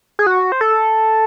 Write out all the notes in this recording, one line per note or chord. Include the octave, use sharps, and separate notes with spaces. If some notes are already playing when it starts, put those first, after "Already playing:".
G#4
F#4
C5
A4